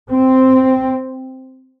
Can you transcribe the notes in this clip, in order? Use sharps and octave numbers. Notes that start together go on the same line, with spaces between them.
C4